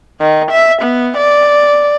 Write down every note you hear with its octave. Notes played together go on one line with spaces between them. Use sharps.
D#3
E5
B3
D5